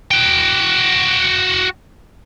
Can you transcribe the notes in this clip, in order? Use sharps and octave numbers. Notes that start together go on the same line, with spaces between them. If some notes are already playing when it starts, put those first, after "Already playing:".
F#4 G5